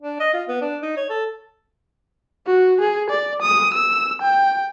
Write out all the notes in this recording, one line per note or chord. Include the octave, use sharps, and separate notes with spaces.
D4
D#5
F4
B3
D4
D#4
C#5
A4
F#4
G#4
D5
D#6
E6
G5